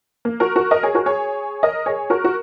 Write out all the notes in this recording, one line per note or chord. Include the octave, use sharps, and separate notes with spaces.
A#3
F#4 A#4
F#4 A#4
A#4 D#5
G#4 C#5
F#4 A#4
G#4 C#5
A#4 D#5
G#4 C#5
F#4 A#4
F#4